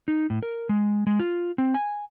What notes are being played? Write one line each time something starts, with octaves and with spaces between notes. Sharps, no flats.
D#4
A2
A#4
G#3
G#3
F4
C4
G#5